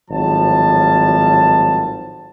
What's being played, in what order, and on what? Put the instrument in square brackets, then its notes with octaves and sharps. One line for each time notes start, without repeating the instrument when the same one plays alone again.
[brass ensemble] G#1 A2 F3 F#3 A5